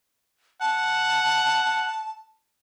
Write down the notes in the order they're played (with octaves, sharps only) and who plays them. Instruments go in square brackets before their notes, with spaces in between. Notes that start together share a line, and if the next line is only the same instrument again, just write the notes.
[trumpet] F#5 [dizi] A5